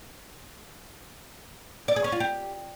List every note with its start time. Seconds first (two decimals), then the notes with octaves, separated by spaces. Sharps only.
1.88 D5
1.96 G#4
2.04 C#4
2.12 F4
2.20 G4